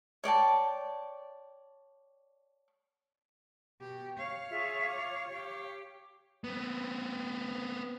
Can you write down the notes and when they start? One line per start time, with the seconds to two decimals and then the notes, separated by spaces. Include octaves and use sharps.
0.24 C#5 D5 G5 A5
3.80 B2 G4
4.17 C#5 F5
4.50 F4 G#4 E5
4.86 F4 D6
5.29 G4
6.44 B3 C4